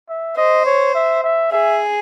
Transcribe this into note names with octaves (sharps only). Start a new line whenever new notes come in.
E5
C5 D#5
C#5
E5
E5
G#4 E5